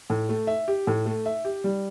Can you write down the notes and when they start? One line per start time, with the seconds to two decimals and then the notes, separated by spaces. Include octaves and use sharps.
0.10 A2
0.29 A3
0.47 E5
0.68 G4
0.87 A2
1.06 A3
1.26 E5
1.45 G4
1.64 G3